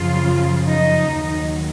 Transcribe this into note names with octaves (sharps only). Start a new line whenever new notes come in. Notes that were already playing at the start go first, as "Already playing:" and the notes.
Already playing: F#2 C#3 F3 F4
D#4
D#2 D#3 F#3